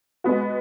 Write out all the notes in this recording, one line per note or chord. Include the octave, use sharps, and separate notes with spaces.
G#3 B3 F#4